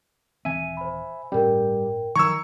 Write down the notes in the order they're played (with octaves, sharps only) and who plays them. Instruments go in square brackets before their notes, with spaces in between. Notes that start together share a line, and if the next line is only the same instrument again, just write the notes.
[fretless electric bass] D#1 E3 C4 [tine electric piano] E5 G#5 [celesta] D#7
[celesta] C5 B5
[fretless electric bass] G1 A2 C#4 [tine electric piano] G3 [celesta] A#4 G5
[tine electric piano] D#3 A#5 G#6 [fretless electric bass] F3 F#3 [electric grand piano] C#6 E6